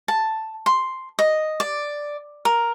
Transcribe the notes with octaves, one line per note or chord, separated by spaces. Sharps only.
A5
C6
D#5
D5
A#4